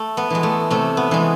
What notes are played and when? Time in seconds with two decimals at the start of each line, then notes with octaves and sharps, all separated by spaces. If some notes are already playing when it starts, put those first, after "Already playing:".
Already playing: A3
0.17 B3
0.30 E3 G#3
0.43 A3
0.70 C3 A3
0.97 B3
1.11 E3 G#3